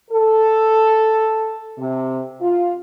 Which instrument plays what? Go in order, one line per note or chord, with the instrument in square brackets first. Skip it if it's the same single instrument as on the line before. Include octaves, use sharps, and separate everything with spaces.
[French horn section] A4
C3
F4